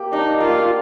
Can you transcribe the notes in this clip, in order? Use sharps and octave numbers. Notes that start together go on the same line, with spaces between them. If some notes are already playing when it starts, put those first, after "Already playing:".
Already playing: A#3 G4
D4 D#4
A#3 F4